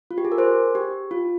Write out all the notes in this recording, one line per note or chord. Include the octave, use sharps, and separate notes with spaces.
F4
G4
G#4
A#4
G#4 C5
G4
F4